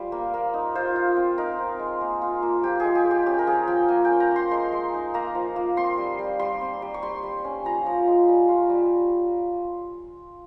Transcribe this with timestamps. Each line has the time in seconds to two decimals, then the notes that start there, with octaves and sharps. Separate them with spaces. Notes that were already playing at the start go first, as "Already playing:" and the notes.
Already playing: G3 F4 C5
0.12 A#3
0.34 A#3
0.54 D#4
0.75 F4 C5
0.96 F4
1.16 C4
1.38 D#4 A#4
1.59 C4
1.79 G#3
2.01 A#3
2.22 F4
2.42 A#3
2.63 F3 G4
2.80 G#3 G#4
2.95 G4
3.05 G#3
3.11 G4
3.26 C#4 G4
3.39 A#4
3.47 F3 G#4
3.68 F3 G5
3.89 A#3 G#5
4.05 G5
4.10 C#4
4.20 A#5
4.31 A#3 C6
4.51 G#3 C6
4.72 G#3
4.94 D#4
5.14 A#3 A#5
5.35 F3
5.56 A#3
5.77 C4 C6
5.98 G3
6.19 G3
6.40 G3 C6
6.61 C4
6.82 G3
6.94 C#6
7.02 G3 C6
7.24 G3
7.44 C#4
7.65 F3 A#5
7.86 F3
8.08 G#3
8.28 G3
8.49 F4
8.70 G3